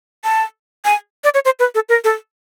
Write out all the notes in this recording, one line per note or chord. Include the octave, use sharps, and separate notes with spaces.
A5
G#5
D5
C#5
C5
B4
A4
A#4
A4